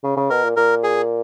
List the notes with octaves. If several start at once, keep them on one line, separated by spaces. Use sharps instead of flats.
C#3
C#3
B2 A#4
A#2
A#2 A#4
G#4